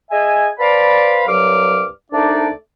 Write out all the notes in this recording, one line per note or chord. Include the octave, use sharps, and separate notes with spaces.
G#4 D#5 E5 G#5
B4 C5 D5 F5 A5 B5
C2 G2 F#3 D6 F6
C2 A3 D4 D#4 D5